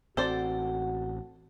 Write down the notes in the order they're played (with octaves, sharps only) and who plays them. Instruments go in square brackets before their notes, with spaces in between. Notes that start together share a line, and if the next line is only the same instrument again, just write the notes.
[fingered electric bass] A1 C4 [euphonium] F#4 [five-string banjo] A4 C5 D5